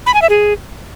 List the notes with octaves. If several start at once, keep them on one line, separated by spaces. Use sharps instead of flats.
B5
G#5
E5
G#4